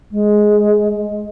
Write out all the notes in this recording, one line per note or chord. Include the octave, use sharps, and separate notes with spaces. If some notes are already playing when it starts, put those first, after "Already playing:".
G#3